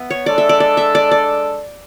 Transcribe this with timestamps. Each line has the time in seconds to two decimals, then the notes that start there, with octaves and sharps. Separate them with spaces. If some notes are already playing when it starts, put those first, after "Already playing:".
Already playing: B3 E5
0.10 C#5
0.26 G#3 D4 A4 D5
0.38 E5
0.49 D5
0.60 D5
0.77 E5
0.95 D5
1.11 D5